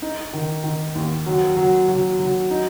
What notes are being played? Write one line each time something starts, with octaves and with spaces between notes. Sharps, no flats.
D#4
D#3
D#3
D#2
F#3
F#3
F#3
F#3
D#4